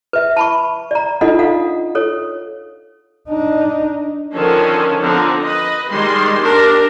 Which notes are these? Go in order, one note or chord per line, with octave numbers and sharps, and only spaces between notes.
B4 E5
A5 B5 C#6
D5 A#5
D4 D#4 F4 A4 D#5 F#5
A4 F5 F#5
A4 C#5
D4 D#4
D3 D#3 F3 C#4 A4
D3 F3 B3 C4 D#4
B4 D#5
D#3 G3 G#3 C6
D4 G4 A#4